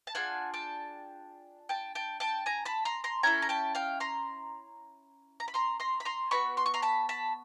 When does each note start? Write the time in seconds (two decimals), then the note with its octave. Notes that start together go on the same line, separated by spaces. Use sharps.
0.07 A5
0.15 D4 F4 G#4 F#5 G#5
0.54 G5 A5
1.69 G5 A5
1.95 G5 A5
2.20 G5 A5
2.46 G#5 A#5
2.65 A5 B5
2.85 A#5 C6
3.04 A#5 C6
3.23 C#4 E4 A4 G#5 A#5
3.42 A#5
3.49 G5 A5
3.75 F5 G5
4.00 A#5 C6
5.40 A#5
5.48 B5
5.54 A#5 C6
5.80 A#5 C6
6.00 B5
6.05 A#5 C6
6.31 B3 D4 F#4 B5 C#6
6.57 C6
6.66 C#6
6.74 A#5 C6
6.82 A5 B5
7.09 A5 B5